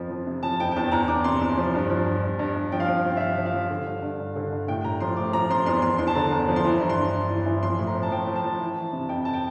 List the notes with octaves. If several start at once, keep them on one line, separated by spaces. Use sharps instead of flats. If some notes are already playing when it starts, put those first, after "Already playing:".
Already playing: F2 F3
F3
C3
F3 A5
F2 G5
G5
E2 A5
E2 A#5
E2 D6
C3 C6
E2
F3
G2
F3
G2
G2
G2
G2
F3 G5
F5
F3 G5
F3
E5
F3 F5
F3
F5
F3
D3
G2
G2
G2
D3
G2
A2 G5
A2 A#5
F3 C6
A2 D6
F3 A#5
F3 C6
E2 C6
E2 C6
E2 C6
A5
D3 A#5
E2
F3
C6
E3 A#5
G2
C6
G2
G2
E3
E3
F3 C6
A2
A#5
F3
A5
F3 G5
F3
A5
F3
E3
E3
C3
F2 G5
A5
G5